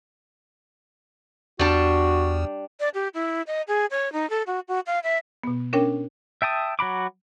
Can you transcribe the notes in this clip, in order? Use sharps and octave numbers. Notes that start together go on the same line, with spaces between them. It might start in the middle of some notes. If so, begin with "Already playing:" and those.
E2 G3 D4 F#4 A5
D5
G4
E4
D#5
G#4
C#5
D#4
A4
F#4
F#4
F5
E5
B2 B3
C#4 D4 A#4 C#5 G5
E5 G5 A5 D#6
F#3 F#4 B5 D6